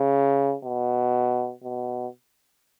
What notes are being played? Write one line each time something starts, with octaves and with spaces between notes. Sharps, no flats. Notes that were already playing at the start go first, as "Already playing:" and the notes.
Already playing: C#3
B2
B2